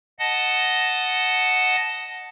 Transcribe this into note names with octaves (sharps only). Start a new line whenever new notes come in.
D#5 F#5 A5